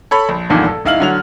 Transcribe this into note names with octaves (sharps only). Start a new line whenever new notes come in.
A4 C#5 B5
A#1
F1 B1 E2 G2 A#2 D#3
A4
D1 D#4 E4 F5 F6 F#7
D3 F#3 F7